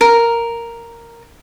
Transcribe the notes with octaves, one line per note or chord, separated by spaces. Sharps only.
A#4